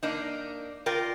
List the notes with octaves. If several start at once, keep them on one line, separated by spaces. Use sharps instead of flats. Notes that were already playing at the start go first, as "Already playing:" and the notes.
A#3 D4 D#4
F4 A#4 D5 G5